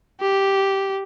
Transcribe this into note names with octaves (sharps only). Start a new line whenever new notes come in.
G4